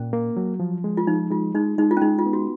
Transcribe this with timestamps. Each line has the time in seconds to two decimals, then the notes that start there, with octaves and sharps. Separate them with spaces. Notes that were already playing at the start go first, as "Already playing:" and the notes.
Already playing: A#2 C#4
0.13 A#3
0.37 F#3
0.60 F3
0.84 G#3
0.97 F4
1.07 F3 D#4
1.30 G#3 F4
1.55 G#3 D#4
1.78 G#3 D#4
1.91 F4
1.97 C#4
2.02 G#3 D#4
2.19 F4
2.26 B3
2.33 F#4